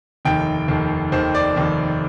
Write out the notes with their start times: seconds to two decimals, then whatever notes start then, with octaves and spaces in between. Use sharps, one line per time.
0.25 F1 D#2 D#3 G5
0.68 F1 D#2 D#3
1.12 F1 D#2 D#3 C5
1.35 D5
1.56 F1 D#2 D#3